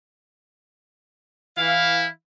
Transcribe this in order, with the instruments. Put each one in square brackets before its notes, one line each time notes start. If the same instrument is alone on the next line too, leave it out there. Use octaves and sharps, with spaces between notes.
[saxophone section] E3 F5 [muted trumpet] E4